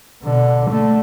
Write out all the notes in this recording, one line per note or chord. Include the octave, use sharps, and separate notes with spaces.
B2 D3
D3 A3